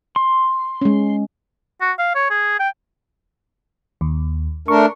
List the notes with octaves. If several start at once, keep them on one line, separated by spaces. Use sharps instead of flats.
C6
G#3 C#4
F#4
F5
C#5
G#4
G5
D#2
A3 D4 A#4 C#6